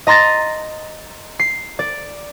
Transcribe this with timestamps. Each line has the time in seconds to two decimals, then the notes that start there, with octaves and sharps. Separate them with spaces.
0.07 D#5 A#5 C6 A6 A#6
1.39 C7
1.79 D5